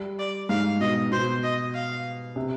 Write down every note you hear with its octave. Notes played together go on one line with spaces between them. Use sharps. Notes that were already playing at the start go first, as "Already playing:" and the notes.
Already playing: G3
D5
G#2 F5
B2 D#5
B2 C5
D#5
F5
C3